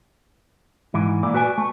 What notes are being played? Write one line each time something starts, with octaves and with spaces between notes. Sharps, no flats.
G#2 E3
A#2 A3 D5
F#4 B4 D5 G#5
A3